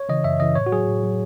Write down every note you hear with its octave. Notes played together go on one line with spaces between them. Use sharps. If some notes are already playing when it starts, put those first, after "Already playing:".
Already playing: C#5
C#3 E3 D#5
F#2 E5
C#3 E3 D#5
A2 C#5
F#4
F#3 G#4
A2
F#3